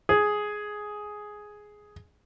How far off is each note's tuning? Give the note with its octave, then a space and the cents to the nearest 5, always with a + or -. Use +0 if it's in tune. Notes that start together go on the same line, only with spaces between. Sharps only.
G#4 +5